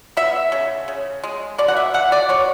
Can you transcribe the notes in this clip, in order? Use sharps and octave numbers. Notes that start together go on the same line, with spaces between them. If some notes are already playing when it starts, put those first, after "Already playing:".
B3 E5
C#3
C#3
G#3
B2 D5
F#5
E5
B2 F#5
D5
B2 C#5